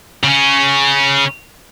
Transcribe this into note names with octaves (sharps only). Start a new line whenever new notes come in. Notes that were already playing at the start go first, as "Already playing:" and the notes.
C#3 C#4